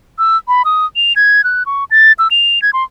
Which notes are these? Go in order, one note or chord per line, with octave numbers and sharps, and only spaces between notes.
E6
B5
D#6
F7
G#6
F#6
C#6
A6
E6
F7
G#6
C6